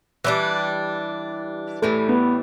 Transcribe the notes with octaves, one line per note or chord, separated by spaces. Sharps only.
E3 G3 D4
A2 E3 G3 A3
B3